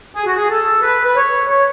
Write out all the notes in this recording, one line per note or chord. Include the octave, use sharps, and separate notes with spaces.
G#4
F#4
G#4
A4
B4
B4
C#5
C#5